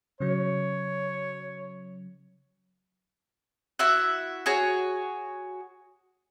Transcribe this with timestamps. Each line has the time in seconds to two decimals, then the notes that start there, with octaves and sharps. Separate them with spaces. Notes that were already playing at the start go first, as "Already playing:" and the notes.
0.20 C#3 F#3 C#5
3.79 E4 F#4 E5 F#5
4.46 F#4 G#4 C#5